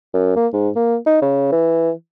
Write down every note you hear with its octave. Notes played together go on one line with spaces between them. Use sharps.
F#2
A#3
G#2
A#3
D#4
C#3
E3